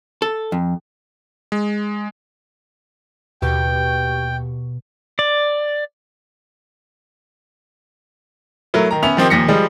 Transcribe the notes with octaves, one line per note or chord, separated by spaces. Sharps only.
A4
F2
G#3
D#2 B2 G4 G5 C#6
D5
F#3 A3 E4 A#4
D#3 A#5
B3 C#4 E5 F7
D#3 F3 C4 G4
D#2 A#2 F3 A#6 B6 C#7
F3 G3 G#3